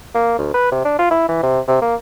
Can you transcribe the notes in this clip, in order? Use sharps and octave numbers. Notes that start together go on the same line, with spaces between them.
A#3
D2
B4
C3
D4
F4
E4
E3
C3
C3
A#3